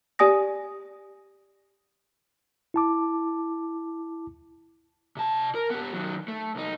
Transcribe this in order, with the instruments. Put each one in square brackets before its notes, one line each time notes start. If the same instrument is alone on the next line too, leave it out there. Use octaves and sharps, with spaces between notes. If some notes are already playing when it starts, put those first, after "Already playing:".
[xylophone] G4 D5 G#5 D#6 A#6
[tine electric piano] E4 A5 D6
[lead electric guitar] C3 A5
A#4
B3 G4
D#3 F#3
A3
C2 D#4